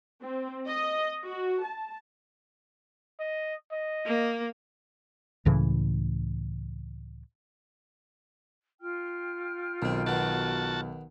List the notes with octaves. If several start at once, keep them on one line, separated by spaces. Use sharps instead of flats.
C4
D#5
F#4
A5
D#5
D#5
A#3
C#2 A2 C#3 E3
F4 G5 F6
B1 D#3 C4
D#3 B3 F#4 A5